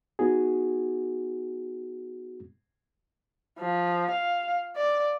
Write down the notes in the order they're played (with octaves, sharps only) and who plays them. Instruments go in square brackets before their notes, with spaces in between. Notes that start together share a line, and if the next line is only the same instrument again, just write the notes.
[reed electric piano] B3 D#4 F#4 G#4
[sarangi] F3
F5
D5